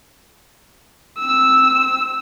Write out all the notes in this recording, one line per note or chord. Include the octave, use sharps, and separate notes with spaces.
C4 E6